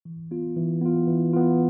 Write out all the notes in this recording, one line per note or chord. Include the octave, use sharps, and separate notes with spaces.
E3
B3 F4
E3
B3 F4
E3
B3 F4